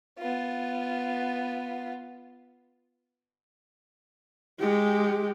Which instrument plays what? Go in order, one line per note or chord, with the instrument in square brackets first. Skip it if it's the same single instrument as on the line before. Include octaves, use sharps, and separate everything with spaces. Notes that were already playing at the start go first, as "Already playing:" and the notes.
[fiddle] B3 F4
[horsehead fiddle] G#3 G4